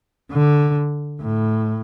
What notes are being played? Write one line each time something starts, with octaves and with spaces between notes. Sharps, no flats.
D3
A2